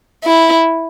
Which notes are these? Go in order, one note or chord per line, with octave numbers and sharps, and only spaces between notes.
E4